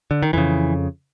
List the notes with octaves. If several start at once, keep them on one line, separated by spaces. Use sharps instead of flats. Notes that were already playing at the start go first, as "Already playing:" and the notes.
D3
D#3
F2 C#3 E3